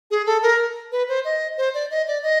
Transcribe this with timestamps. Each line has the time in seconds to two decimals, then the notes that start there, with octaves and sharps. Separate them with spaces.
0.11 G#4
0.26 A4
0.43 A#4
0.92 B4
1.09 C5
1.25 D#5
1.58 C5
1.74 D5
1.91 D#5
2.07 D5
2.23 D#5